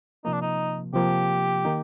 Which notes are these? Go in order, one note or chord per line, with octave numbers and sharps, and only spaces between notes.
C3 F3 A#3 D#4
D4
D#4
C3 F3 A#3 G4
D#3 A#3 D#4